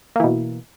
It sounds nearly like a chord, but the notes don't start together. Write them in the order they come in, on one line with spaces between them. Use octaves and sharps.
A#3 E3 B2